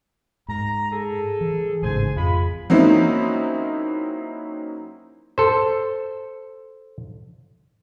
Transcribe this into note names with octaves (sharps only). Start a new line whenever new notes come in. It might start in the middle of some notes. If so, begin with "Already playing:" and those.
G#2 A#5
G#4 A4
E3
A1 G#2 C#3 G#4 C5 G#5
F2 G#3 F4 B5
F#3 A#3 C4 C#4 D#4 E4
A4 C5